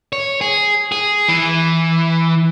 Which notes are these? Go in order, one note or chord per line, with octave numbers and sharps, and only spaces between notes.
C#5
G#4
G#4
E3